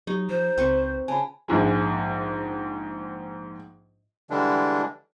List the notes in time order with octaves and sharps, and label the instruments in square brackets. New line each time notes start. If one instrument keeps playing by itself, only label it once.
[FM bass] F#3 [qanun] D#4 [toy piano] G4
[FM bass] F3 [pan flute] C5
[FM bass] C#2 [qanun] C4 B4 C#6
[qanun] C#3 [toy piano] G#5 A5 B5
[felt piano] A#1 G#2 G#3
[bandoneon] D3 E3 G3 G#3 D4